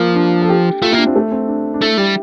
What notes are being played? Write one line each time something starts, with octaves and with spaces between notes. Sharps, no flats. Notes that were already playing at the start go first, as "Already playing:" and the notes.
Already playing: F3 A#3
D4
A4
G4
A3 F4
A#3 E4
D4
C4
A3
C4
D4
D4
A3 E4
G3 G4